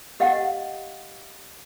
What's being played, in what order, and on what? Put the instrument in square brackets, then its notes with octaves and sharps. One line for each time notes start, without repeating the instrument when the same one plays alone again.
[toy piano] G4 D#5 F5 F#5